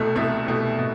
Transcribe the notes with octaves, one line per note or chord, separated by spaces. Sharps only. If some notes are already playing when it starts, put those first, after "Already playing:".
Already playing: C2 B2 A3
C2 B2 A3 E5
C2 B2 A3
B2